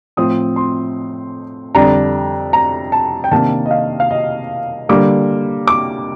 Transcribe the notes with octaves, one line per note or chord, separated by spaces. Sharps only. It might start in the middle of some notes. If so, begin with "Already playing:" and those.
A2 F3 C4 D#6
C6
F2 D3 G3 D4 A#5
A#5
A5
G5
C3 D#3 A#3 D4 A5
D#5
F5
F5
D#5
D3 G3 A#3 D6
D6